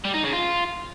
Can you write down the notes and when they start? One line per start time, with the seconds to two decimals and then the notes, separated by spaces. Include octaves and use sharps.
0.05 G3
0.14 D#4
0.23 C#3
0.33 F4